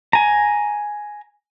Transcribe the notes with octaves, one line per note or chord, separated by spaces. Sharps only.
G#5 A#5